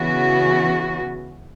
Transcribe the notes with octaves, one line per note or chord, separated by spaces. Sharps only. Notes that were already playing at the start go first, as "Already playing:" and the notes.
Already playing: C#3 E3 B3 F#4